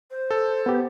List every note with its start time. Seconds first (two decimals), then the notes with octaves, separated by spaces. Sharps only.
0.10 C5
0.31 A4
0.66 B3 G4